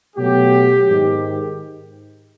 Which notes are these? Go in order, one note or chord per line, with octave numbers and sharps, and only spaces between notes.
B2 F#3 A3 G4
G#2 D#3 G#3